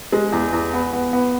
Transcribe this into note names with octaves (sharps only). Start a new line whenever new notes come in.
G#3
E2
E2
B3
B3
B3